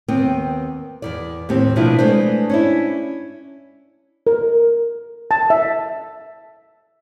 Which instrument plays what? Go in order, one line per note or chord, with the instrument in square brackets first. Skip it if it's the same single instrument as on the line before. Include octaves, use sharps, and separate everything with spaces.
[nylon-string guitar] D#2 B3 C4 G5
E2 C3 D5
D#2 A2 C4 G4
B2 F3 B3 D4 E4 F4
G#3 A3 D4 B4 C5
C#4 D4 E4
[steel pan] A#4
A5
E5